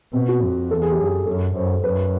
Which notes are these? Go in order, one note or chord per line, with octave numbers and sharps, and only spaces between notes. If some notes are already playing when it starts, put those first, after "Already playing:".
B2 C4
F#4
F2
E2 A4
G#4
G4
F#2 G#4
F#2 A4
F#2 C5
F#2 B4